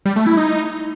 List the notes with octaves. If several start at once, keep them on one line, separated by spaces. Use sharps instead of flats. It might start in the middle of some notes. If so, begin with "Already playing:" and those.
G3
A3
E4
D#4